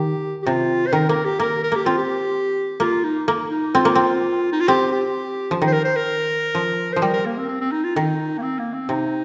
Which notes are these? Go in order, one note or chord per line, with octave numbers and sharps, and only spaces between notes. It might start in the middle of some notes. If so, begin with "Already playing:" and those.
Already playing: D#3 G4
G4
C3 F4
C5
D#3 A#4
A#3 A#4
G4
A#3 A#4
A#4
A#3 G4
C4 F4
G4
A#3 F4
D#4
A#3
D#4
C4 F4
A#3
C4
D#4
F4
C4 G4
G4
F3
D#3
C5
A#4
C5
A#4
F3
F3 C5
G3 A#4
A#4
A#3
C4
C4
C4
D#4
F4
D#3 D#4
A#3
C4
A#3
C4
C3 D#4